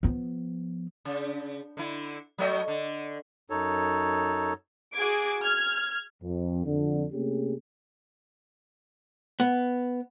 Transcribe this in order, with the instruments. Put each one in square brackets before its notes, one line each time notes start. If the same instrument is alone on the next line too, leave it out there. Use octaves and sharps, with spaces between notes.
[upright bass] F3 B3
[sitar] C#3
D3 E4
F#3 A3 D#5
D3
[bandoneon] F#2 D#4 A4 C#5
[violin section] F#4 G#4 D6 G#6 D7
F6 G#6
[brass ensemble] F2
F2 D3
C3 A3 A#3 C#4 G4 G#4
[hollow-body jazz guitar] B3